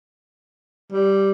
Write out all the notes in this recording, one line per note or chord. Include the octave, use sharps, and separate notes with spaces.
G3